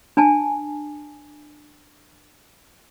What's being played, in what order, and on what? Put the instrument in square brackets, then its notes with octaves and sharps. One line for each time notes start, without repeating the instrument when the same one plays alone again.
[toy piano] D4 G#5 A5